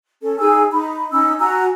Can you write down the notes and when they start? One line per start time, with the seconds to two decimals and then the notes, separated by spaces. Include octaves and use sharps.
0.22 C#4 A4
0.39 D#4 G#4 G#5 E6
0.72 D#4 B5
1.12 C#4 D#4 E6
1.39 F#4 G#5 A#5 E6